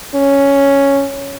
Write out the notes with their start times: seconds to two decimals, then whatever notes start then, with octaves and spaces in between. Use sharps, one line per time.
0.15 C#4